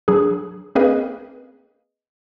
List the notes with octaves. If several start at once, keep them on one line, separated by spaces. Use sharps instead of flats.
F#3 D4 G#4
A#3 C4 G#4 A#4 B4 D#5